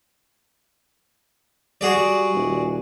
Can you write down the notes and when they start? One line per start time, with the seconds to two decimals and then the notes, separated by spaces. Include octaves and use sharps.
1.81 G3 F#4 G#4 D5
2.34 D#1